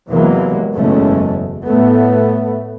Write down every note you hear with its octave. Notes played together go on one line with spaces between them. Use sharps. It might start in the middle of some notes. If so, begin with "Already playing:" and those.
E2 C3 E3 F#3 G#3 A#3
F#1 E2 B2 G#3 A3 C#4
A2 A3 B3